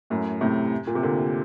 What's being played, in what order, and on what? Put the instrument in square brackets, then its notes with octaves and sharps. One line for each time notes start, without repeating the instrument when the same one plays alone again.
[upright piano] F#2 A2
A2 C3
A#2
C3
A#2 D3